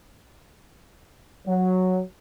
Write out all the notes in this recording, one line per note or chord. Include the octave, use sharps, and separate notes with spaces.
F#3